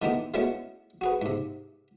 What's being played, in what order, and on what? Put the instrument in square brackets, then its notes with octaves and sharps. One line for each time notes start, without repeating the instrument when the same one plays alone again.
[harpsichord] D#3 A3 B3 D#4 E4 G4
G#3 A3 B3 C#4 E4 F#4
F#4 G#4 B4
G#2 C3